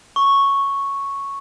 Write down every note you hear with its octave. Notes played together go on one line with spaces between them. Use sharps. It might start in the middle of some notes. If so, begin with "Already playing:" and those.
C#6